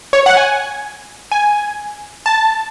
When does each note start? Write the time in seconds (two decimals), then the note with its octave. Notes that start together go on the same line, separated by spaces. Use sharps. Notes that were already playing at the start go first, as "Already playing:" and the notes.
0.13 C#5
0.26 F#5
0.37 G#5
1.32 G#5
2.26 A5